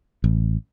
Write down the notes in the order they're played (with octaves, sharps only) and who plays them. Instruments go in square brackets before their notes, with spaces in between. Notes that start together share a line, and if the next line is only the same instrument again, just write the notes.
[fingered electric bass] A1